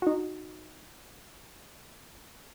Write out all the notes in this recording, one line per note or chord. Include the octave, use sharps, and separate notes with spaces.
D#4 F#4